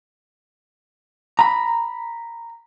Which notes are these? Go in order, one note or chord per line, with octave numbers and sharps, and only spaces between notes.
A#5 B5